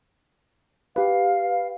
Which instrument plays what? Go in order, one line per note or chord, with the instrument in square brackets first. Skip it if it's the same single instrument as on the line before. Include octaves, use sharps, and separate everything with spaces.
[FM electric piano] G4 B4 [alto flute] F5